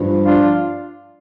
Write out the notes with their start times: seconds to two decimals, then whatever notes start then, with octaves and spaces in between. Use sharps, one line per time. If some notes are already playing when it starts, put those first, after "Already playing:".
Already playing: G2 F3
0.23 D4 F4